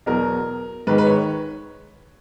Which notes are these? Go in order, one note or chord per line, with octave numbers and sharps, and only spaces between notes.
E2 B2 F#3 A#4
G#2 D#3 G#3 B4
B4
C#5